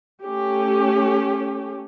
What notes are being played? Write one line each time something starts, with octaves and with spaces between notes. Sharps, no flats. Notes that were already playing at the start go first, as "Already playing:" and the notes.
A3 C#4 G4